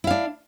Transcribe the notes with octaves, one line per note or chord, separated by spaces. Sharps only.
D4 E4 F5